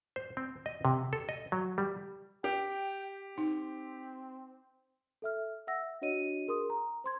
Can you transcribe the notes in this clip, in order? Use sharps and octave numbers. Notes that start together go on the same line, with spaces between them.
C5
C4
D#5
C3
A4
D#5
F#3
G3
G4 G5
C4 D#4
A4 E5 F6
E5 F#5 E6 A#6
D4 F#4 C#5 D#5 D#7
G#4 A#4 C6 D#6
A#5
C5 C6 G#6